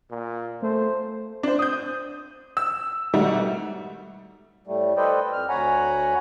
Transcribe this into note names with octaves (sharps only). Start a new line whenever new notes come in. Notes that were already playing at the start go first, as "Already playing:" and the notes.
A#2
A3 C5
D4 C5
D#6 G6
E6
G#2 B2 D#3 G3 A3
A2 G3 A3
A4 B4 C5 D5 D#5 G5
F2 F6
D2 C#5 F#5 G#5 A#5 B5